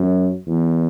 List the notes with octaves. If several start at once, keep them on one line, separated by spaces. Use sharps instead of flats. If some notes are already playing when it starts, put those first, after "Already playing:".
Already playing: F#2
E2